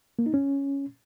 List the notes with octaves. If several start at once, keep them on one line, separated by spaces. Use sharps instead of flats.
A#3
D#4
C#4